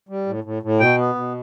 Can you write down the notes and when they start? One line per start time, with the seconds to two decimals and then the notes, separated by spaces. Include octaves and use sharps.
0.09 G3
0.26 A2
0.44 A2
0.63 A2
0.80 B2 G5
0.98 B3
1.15 B2